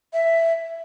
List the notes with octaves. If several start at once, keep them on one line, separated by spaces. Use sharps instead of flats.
E5